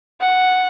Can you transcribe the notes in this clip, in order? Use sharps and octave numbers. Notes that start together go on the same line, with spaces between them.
F#5